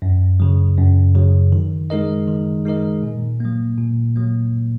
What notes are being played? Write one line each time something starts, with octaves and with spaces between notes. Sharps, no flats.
F#2
C#3 F#3
F#2
C#3 F#3
D#3
G#3 D#4 A#4 D#5
D#3
G#3 D#4 A#4 D#5
A#2
F#3 A#3
A#2
F#3 A#3